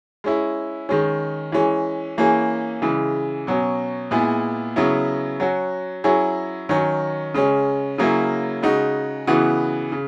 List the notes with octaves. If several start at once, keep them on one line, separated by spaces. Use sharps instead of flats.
G#3 C#4 E4
D#3 G#3 C#4
E3 G#3 C#4
E3 A#3 C#4 G#4
C#3 E3 G#3
B2 F#3 C#4
A#2 G#3 B3 E4 G#4
C#3 F#3 B3 E4
F#3 C#4 F#4
F#3 C#4 E4 G#4
D#3 F#3 C#4
C#3 G#3 C#4
C#3 F#3 A#3 C#4 E4
C#3 G#3 D#4 F#4
C#3 E3 B3 F#4
C#3